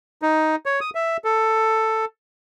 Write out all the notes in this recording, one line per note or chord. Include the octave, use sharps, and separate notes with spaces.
D#4
C#5
D#6
E5
A4